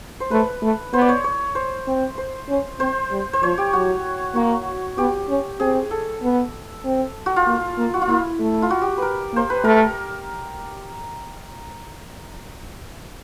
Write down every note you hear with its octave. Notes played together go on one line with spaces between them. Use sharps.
C5
A3 B4
A3
B3 C5
D5
C#5
C#5
C5
C4
C5
C#4
C4 C5
G3
C5
F3 C#5
G4
F#3 F#4
A#3 F#4
B3 G4
C#4
C4 G#4
A4
B3
C4
F#4
F4
A#3
A#3
F#4
F4
A#3 E4
A3
F4
F#4
G4
A#4 B4
A#3 C5
B4
A3 A#4